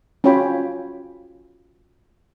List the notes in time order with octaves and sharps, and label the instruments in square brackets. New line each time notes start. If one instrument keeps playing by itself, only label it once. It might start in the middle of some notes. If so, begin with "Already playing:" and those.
[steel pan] C#4 F4 F#4 C#5 G5 B5